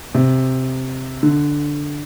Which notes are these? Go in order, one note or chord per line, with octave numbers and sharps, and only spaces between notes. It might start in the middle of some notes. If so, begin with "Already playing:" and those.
C3
D3